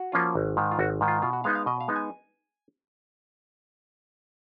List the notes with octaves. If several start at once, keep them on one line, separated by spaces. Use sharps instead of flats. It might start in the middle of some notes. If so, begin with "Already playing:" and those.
Already playing: F#4
F3 A#3 C#4 F4
G#1
G#2 D#3
F4
G#1 F#4
G#2 D#3
F4
B2 F4
F#4
G#3 B3 D#4 F5
F5
B2 D#5
F5
G#3 B3 D#4
G#5